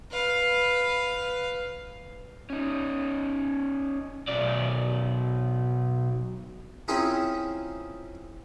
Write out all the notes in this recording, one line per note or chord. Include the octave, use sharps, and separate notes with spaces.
B4 F5
C#4 D#4
B1 D5
C4 C#4 E4 F4 G#4 A#4